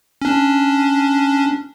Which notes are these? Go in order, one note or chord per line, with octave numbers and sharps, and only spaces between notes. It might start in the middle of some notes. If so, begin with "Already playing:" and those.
C#4 D4